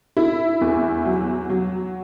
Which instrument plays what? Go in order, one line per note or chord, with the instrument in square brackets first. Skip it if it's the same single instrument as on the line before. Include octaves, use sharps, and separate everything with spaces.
[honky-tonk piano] E4
E2
F#3
F#3